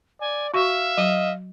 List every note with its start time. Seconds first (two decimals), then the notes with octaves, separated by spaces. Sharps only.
0.20 D5 G#5
0.54 F#4 E5 F5 C#6
0.98 F#3 D#5